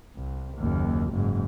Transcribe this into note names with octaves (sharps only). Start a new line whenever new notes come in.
C2
F#1 D#2
F#1 G#2